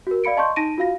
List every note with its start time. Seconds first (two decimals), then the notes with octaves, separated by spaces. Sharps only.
0.07 F#4 A#4
0.24 D5 F5 B5 C#7 D7
0.37 D#5 A5 C6 C#6 G6
0.56 D#4 A5 A#6 D7 D#7
0.78 F4 F#4 F5 A#6